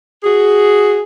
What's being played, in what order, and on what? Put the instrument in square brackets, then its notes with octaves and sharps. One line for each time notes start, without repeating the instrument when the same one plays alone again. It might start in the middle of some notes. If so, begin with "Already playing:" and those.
[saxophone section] F#4 G#4